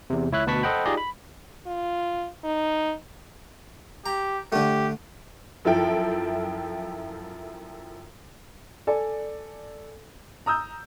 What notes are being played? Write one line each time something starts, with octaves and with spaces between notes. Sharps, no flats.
E2 C3
C#2 E4 C#5 E5 F#6
D2 B2 B4 A5 C#6 B6
A4 C5 D#5 F#5 G5 B5
D#4 F4 G4 G#4 D5 D#5
B5
F4
D#4
G4 A#5
D3 A3 G4
F#2 F3 E4 A4 G5
A4 D5 G#5
A#5 D#6 E6 G6